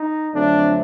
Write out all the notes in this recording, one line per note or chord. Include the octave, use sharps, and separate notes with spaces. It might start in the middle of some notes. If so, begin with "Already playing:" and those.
Already playing: D#4
F2 D3 F#3 A3 C4 D4